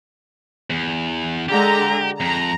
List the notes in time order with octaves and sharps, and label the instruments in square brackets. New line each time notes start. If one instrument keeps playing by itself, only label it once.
[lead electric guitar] E2
[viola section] D3 G#3 A#5 [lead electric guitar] G4
[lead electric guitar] F2 [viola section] A#5